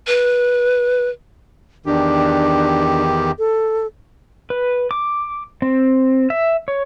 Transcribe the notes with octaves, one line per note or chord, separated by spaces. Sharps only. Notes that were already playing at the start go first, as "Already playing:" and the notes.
B4
E2 D#3 D4 G4
A4
B4
D6
C4
E5
C#5